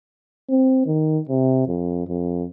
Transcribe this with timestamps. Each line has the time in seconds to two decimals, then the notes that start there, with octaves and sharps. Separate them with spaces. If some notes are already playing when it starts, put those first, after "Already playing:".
0.50 C4
0.86 D#3
1.29 C3
1.67 F2
2.08 F2